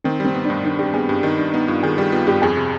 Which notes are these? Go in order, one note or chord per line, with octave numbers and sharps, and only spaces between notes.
D#3 C4
G3 C4
B3
D4
G2
D#3 D4
G3 G4
B3 G#4
G2 G4
D#3 D#4
G3 D4
B3 D#4
G2 F4
D#3 G#4
G3 G4
B3 F4
G2 G4
F2 G#4
C3